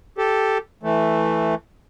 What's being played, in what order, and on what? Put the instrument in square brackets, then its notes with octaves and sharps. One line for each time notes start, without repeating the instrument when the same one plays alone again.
[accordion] G4 A4
E3 A3